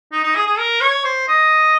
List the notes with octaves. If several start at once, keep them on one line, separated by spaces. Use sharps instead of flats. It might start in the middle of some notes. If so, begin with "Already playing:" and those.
D#4
D#4
G#4
G#4
A#4
C#5
C5
D#5